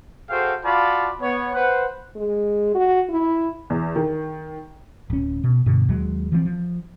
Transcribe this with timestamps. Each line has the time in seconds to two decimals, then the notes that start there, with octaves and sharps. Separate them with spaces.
0.30 F#4 G#4 A4 C5 F5 G5
0.64 F4 F#4 D5 F5 A5 B5
1.21 B3 C#5
1.54 B4 C5 F#5
2.16 G#3
2.75 F#4
3.10 E4
3.70 E2
3.96 D#3
5.10 D1 C#4
5.44 B2
5.66 G2 B2 D3
5.89 D#2 F#3 G#3
6.32 E3 F3 B3 C4
6.45 F3